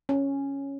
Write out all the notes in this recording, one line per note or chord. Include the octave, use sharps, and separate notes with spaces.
C#4